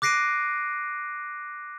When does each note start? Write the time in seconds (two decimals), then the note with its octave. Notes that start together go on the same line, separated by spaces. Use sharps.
0.02 D6 F#6 A#6 C7 D7 D#7